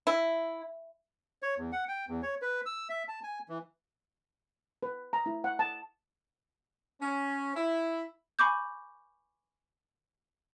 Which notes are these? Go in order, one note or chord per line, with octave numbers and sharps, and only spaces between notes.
E4
C#5
E2
F#5
G5
E2
C#5
B4
E6
E5
A5
G#5
E3
B4
A#5
E4
F#5
A5
C#4
E4
G#5 B5 C#6 D6 G6